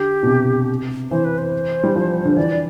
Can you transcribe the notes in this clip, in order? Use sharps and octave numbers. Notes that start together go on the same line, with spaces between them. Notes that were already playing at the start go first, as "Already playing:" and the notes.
Already playing: D3 G4
B2
C3
E3 C5
B4
C5
G3
F3
D3
E3 D5